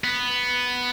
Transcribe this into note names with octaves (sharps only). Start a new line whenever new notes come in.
B3